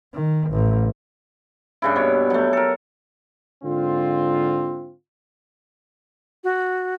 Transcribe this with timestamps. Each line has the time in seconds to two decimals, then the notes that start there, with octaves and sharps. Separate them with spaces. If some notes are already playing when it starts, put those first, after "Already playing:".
0.14 D#3
0.51 A1
1.82 G2 C#3 E4
1.96 B2 C#5
2.30 F#3 A3
2.53 A4 A#4
3.64 G#2 D3 C4 F4
6.44 F#4